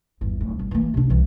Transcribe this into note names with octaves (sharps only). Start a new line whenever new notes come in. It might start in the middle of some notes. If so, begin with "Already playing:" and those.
G1 E2
D1
G1
E3 A#3
C3 D4
C2 E3